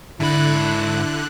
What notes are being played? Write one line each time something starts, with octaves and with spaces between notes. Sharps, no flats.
G#2 D3 E4 B5 F#6